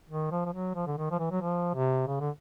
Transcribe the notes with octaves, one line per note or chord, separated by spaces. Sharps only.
D#3
F3
F3
F#3
F3
D3
D#3
F3
E3
F#3
F3
C3
C#3
D3